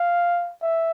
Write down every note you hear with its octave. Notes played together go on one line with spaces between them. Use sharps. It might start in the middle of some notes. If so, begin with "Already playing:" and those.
Already playing: F5
E5